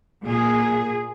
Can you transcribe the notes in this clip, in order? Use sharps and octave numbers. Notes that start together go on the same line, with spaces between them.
A#2 G#4